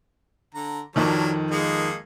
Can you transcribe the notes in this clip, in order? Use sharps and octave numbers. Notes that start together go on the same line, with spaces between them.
D3 A#5
F2 D#3 F#3 D4 A#4
G#3 A#3 D#4